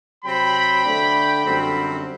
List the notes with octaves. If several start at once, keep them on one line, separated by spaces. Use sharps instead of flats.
C3 F#3 C4 G5 B5
D3 A3 D4
F#2 D3 G3 C4